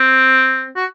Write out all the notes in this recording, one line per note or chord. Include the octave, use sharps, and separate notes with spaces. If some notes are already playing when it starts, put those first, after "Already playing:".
Already playing: C4
F#4